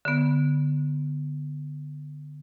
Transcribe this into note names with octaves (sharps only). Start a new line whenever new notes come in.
D3 B3